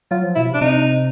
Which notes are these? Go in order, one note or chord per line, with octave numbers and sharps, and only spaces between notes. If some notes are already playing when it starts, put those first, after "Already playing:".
F#3 F4
F3
B2 E4
C3
D4
C3 D#4